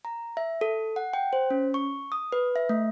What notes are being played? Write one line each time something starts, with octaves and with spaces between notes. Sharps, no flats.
A#5
E5
A4
F#5
G5
C5
C#4
C#6
D#6
B4
E5
A3